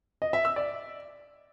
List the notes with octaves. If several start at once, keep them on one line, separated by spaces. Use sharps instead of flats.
D#5
E5
E6
D5